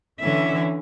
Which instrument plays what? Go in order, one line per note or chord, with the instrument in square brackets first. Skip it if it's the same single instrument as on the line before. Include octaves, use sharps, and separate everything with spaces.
[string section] D3 E3 [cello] C#4 E5